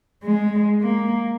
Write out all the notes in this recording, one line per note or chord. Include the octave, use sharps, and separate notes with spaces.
G#3
A#3